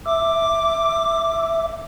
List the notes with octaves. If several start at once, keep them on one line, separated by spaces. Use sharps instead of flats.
E5 D6